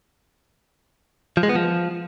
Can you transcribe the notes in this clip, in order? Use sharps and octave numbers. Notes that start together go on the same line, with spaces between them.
F3
G#3
B3
F3